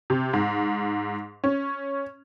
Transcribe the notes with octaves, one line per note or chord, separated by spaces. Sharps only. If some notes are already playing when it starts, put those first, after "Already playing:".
C3
G#2
C#4